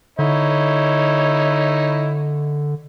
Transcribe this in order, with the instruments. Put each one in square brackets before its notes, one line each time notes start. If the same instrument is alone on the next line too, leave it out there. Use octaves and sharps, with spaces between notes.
[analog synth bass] D3 [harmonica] D#4 E4 C#5